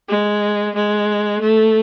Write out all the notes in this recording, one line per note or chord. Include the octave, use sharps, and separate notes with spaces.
G#3
G#3
A3